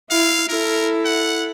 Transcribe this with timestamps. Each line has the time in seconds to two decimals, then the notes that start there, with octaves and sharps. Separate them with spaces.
0.10 E4 F5
0.49 E4 A4 A#4
1.05 F#5